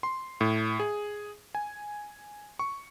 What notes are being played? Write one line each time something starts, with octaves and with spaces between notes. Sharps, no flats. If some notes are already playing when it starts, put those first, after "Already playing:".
C6
A2
G#4
G#5
C#6